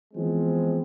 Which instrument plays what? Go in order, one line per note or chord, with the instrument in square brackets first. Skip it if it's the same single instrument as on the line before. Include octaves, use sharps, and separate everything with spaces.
[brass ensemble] E3 F3 G#3 B3 C4